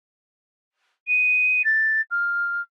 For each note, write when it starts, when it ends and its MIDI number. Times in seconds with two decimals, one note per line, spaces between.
1.07 1.62 99
1.65 2.01 93
2.11 2.61 89